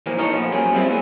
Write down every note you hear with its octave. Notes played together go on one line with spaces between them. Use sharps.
A#2 E3 F3 A#3
D#4 F4 A4 A#4 C#5 D#5
A#2 F3 B3
F3 F#3 A#3 C#4 G#4
G3 G#3 C4 E4 F4
A#2 B3 G#4